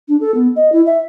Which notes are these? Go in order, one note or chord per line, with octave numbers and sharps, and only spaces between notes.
D4
A4
B3
D#5
E4
E5